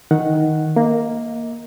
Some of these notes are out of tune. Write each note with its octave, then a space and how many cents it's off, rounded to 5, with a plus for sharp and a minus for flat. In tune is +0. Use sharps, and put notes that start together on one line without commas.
D#3 +5 F#5 +0
A#3 +0 D#5 +30